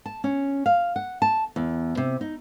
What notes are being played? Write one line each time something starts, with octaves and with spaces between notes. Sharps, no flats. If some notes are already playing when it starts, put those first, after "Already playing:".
A5
C#4
F5
F#5
A5
E2
C3
D#4